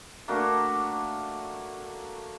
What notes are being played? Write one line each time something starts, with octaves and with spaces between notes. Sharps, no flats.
A3 A#3 D4 F#4